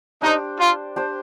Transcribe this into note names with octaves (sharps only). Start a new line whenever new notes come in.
D4 D#4 G4 C5
F4
D4 G4 C5